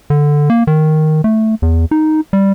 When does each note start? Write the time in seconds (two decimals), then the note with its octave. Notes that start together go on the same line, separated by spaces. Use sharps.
0.10 D3
0.50 A#3
0.67 D#3
1.24 A3
1.62 E2
1.91 D#4
2.33 G3